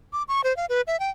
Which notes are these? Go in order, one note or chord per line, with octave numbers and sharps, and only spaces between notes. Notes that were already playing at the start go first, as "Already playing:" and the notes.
D6
C#6
C5
F5
B4
E5
G5